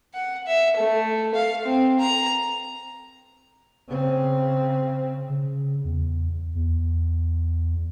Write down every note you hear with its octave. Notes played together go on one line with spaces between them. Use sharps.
F#5
E5
A3
F5
C4
A#5
C#3 C4
C#3
E2
E2